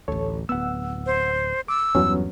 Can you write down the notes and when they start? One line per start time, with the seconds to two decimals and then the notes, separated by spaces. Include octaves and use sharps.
0.08 A1 D2 A4 C#5
0.49 D1 B3 F#5 E6
1.06 C5
1.68 D6 E6
1.95 E2 G2 F#3 B3 C#4